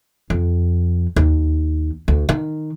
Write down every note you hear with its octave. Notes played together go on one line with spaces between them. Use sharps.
F2
D#2
D2
D#3